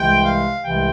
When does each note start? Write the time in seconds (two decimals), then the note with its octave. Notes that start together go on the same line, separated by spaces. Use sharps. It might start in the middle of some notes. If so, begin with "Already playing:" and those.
Already playing: C2 C3 E3 G#3 G5
0.25 F5
0.63 C2 C3 E3 G#3 G5